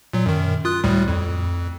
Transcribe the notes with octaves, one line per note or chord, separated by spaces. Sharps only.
A#2 F#3
F#2 D#3
F4 D#6 F#6
D2 A2 G3
F2